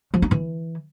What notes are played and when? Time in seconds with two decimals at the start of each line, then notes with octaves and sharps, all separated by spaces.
0.14 F3
0.22 D#4
0.31 E3